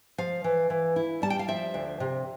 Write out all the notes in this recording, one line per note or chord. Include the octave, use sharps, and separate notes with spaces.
F3 F5
E3
E3
E4
G3 A5
G5
F5
F3 E5
D2
C3